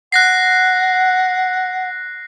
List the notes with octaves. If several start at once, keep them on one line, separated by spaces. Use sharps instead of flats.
F#5 F#6 A#6 C7